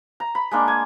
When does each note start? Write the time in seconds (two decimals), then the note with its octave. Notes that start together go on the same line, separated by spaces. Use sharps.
0.20 A#5
0.35 B5
0.51 G#3 A#3 D4
0.68 G#5